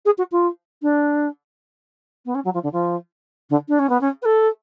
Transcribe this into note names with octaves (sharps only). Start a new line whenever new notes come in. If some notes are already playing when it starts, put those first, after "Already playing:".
G#4
F#4
F4
D4
B3
C#4
F#3
F3
D3
F3
D3
D4
C#4
B3
C#4
B4
A4